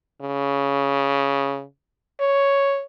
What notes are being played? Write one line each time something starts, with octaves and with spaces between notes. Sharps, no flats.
C#3
C#5